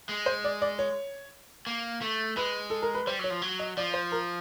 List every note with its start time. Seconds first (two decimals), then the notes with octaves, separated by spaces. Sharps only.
0.09 G#3
0.26 C5
0.44 D5
0.62 D5
0.79 C#5
1.67 A#3
2.02 A3
2.37 G#3 B4
2.70 A4
2.82 A#4
2.94 B4
3.07 G3 C5
3.19 F#3 C#5
3.30 F3
3.42 F#3
3.59 D#5
3.77 F3 D5
3.94 C5
4.12 A#4